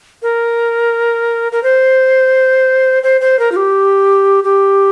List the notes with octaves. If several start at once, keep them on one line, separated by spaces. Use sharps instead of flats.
A#4
A#4
C5
C5
C5
A#4
F4
G4
G4